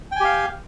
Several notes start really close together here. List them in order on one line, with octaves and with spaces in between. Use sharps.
G5 G#5 G4 F5